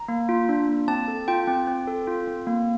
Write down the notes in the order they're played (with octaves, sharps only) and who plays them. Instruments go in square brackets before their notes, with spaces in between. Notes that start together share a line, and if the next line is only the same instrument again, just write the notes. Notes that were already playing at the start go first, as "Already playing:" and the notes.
Already playing: [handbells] A#5
A#3
F4
D4
A#3
C4 A5
A4
F4 G5
C4
C4
A4
F4
C4
A#3